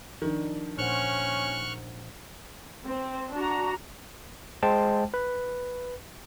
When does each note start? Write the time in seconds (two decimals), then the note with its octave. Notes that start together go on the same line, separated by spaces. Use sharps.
0.22 D#3 F3 D4
0.78 A#2 C#4 C5 F#5 C#6 F6 F#6
2.86 C4
3.33 D4 F#4 A#5
4.63 G#3 C5 G5 A5
5.14 B4